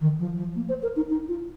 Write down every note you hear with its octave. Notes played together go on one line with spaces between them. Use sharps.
D#3
F3
F3
A#3
C5
A#4
D#4
D#4
F4